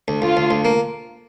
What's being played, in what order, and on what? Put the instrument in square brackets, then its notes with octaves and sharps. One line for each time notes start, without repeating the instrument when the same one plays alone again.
[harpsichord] D2
[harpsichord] D2 [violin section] F4
[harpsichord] D2
D2
A#3